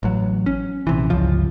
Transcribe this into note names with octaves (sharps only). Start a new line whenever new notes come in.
A1 F#3
C#4
A#1 C3 E3
G1 C#2 F3